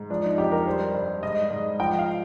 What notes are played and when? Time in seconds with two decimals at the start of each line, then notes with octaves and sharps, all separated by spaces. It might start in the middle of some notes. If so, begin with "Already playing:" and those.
Already playing: G#2
0.10 F3 D4
0.24 D#4
0.38 F2 G4
0.52 A#4
0.67 G3 C5
0.95 G2
1.22 G#2 D#5
1.51 G#2
1.80 F3 G5
1.99 F5